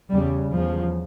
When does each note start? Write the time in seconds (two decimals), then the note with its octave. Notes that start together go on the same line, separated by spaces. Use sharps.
0.11 E2 C#3 G3
0.54 E2 C#3 F3